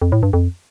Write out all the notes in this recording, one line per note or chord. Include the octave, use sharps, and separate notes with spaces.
F2
A2
G2
F2